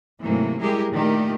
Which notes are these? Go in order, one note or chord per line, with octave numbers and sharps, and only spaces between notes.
G#2 C3 E3 F#3 A3 A#3
G3 G#3 E4 G4 G#4 A#4
A#2 D#3 A3 D4 G4